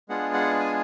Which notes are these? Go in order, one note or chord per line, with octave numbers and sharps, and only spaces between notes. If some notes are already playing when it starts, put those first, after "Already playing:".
G#3 B3 D4 F4 G#4 F#5
F#5
G#5